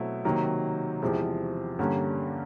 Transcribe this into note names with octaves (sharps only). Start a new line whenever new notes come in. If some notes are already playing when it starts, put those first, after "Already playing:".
Already playing: B2 F#3 A3 C4 E4
C3 D#3 F#3 A#3
E2 C3 F3 G#3
G2 D3 G3 A#3 C#4